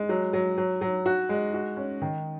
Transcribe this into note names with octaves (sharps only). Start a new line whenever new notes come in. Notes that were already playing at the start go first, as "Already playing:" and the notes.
Already playing: G#3
F#3
F#3
F#3
F#3
F#4
G#3
F#4
C#4
D#3